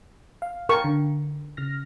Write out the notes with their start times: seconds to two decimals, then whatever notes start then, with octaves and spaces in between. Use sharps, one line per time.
0.42 F5
0.69 A#4 F5 G5 A5 C#6
0.84 D3
1.57 C#3 F6 A#6